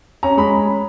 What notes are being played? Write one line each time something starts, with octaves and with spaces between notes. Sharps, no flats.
C#4 A#5
G#3 B5